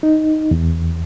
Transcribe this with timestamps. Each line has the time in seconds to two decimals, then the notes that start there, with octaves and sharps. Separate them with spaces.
0.03 D#4
0.51 E2